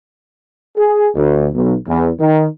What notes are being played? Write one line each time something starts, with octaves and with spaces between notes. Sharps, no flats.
G#4
D2
B1
E2
D#3